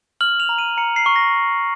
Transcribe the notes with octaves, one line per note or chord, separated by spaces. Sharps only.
F6 F#7
F7
A#5
D#7
A#5 C#7
C7
C#6
A#6